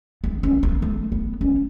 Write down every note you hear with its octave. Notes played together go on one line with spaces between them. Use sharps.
B3
C#4
B3
A3
B3
C#4